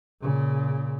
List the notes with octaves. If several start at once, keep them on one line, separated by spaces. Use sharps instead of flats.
A#2 C#3